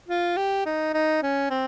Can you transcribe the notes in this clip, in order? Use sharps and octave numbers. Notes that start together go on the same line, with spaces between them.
F4
G4
D#4
D#4
C#4
C4